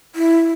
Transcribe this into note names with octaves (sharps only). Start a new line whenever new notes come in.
E4